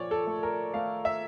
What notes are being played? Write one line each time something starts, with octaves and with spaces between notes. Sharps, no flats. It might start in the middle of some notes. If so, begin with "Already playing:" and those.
Already playing: A#2 F3 C#5 D5
A4
A3
A#4
A3 F5
E5